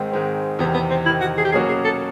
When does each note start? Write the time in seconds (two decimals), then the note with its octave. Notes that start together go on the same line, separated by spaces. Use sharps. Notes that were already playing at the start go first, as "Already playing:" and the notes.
Already playing: G#2 D#3 G#3 C4
0.12 G#2 D#3 G#3 C4
0.59 E2 C3 D#3 B3
0.74 B3
0.90 C4
1.06 E2 C3 D#3 E4
1.21 F#4
1.38 G#4
1.45 G4
1.52 B2 F#3 A#3 C#4 F#4 G#4
1.69 G#4
1.85 A4